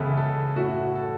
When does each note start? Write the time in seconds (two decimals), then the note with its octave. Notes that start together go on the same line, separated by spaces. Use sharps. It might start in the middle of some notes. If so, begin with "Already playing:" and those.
Already playing: C#2 C#3 E3 B3 E4 A4
0.17 A4
0.56 A2 A3 C#4 E4 F#4
0.95 A4